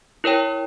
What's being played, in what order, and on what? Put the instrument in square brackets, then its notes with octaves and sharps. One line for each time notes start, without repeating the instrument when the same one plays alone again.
[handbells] E4 A#4 C#5 G5